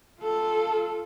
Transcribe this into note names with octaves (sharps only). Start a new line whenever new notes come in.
F4 A4